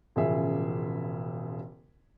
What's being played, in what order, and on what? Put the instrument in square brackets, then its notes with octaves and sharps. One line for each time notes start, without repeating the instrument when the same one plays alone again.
[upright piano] E1 A1 C#3 F3 G#4 E5